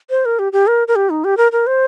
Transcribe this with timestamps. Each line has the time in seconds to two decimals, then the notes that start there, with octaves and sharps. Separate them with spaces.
0.10 C5
0.25 A#4
0.39 G4
0.53 G4
0.67 A#4
0.88 A#4
0.96 G4
1.10 D#4
1.24 G4
1.37 A#4
1.52 A#4
1.67 C5